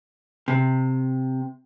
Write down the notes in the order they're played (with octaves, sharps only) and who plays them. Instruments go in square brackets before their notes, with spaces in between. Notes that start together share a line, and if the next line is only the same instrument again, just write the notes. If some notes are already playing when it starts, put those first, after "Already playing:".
[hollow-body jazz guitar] C3